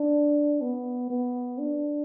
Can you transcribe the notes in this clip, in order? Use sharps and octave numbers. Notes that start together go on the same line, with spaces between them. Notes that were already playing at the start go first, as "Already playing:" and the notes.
Already playing: D4
B3
B3
D4